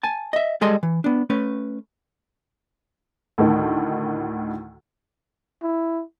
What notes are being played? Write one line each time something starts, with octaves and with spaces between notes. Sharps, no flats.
G#5 A5
D#5 E5
G3 G#3 G#4 A4 D#5 C6
E3
B3 D4
A3 C#4 B4
D2 A2 D#3
E4